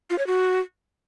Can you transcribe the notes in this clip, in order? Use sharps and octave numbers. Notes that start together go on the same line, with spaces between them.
F4
C#5
F#4